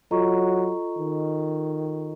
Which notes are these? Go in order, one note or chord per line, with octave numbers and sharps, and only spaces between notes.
F#3 F4 A4 D#5 A#5 C#6
D#3